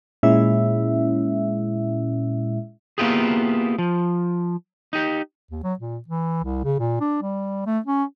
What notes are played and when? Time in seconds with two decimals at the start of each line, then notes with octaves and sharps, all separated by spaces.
0.23 A#2 G#3 C#4 E4 E5
2.98 A#3 B3 E4 F4 G4 G#4
3.79 F3
4.93 D#4 G4
5.51 D#2
5.63 F#3
5.79 A#2
6.08 E3
6.43 C2
6.64 C#3
6.79 A#2
7.00 D4
7.22 G3
7.66 A3
7.86 C#4